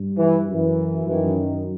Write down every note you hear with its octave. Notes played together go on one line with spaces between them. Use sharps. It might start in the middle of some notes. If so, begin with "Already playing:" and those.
Already playing: G2
E3
F#2 E3
F#2 D#3 E3